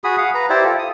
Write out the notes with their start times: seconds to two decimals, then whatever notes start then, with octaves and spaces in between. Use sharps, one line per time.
0.04 F#4 G#4 B5 D#6
0.18 F5 F#5 D#6
0.34 B4 A#5
0.50 E4 G4 C5 D5
0.64 F4 A4
0.79 D#6